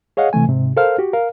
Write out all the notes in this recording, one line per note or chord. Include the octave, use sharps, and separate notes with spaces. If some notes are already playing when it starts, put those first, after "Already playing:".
G#4 C#5 D#5 F5 F#5
C3 E3 A3 G#5
G#2 C3
A4 A#4 C5 F5 F6
F#4 G4
A#4 F5